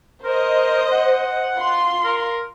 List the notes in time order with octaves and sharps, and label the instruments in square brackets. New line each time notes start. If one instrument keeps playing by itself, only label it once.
[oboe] A#4 [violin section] C5 D#5
[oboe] F#5
[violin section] F4 C6
[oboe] A#4